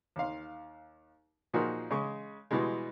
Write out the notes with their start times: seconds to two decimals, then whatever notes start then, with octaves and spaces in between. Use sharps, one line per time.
0.16 D#2 F5
1.54 A#2 F3 A#3 D#4 F#4 G#4
1.91 C#3 G#3 C#6
2.51 B2 E3 G3 G#3